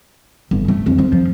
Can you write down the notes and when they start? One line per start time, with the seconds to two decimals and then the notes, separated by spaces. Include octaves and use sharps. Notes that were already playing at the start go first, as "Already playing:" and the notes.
0.51 G1
0.68 A3
0.86 F2
0.99 F3
1.12 F3